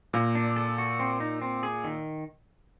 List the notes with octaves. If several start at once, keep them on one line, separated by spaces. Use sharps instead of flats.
A#2 A#3
D4
A4
F#4
C4
D#4
C4
G#4
D#3